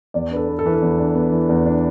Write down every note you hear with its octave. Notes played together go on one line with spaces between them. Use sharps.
E2 D5
D4 B4
A4
B3
A4
E3 B4
A4
E2
D4
B3
E3
E2
D4